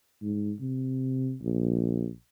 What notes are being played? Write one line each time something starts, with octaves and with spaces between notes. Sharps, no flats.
G#2
C3
A#1